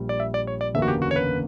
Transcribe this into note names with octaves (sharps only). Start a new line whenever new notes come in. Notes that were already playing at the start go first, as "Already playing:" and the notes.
Already playing: A#1 A#2 G3
D5
E5
D5
C#5
D5
F#1 E2 D3 A#3 C#4 E5
F#4
G4
F#4
C#5
B4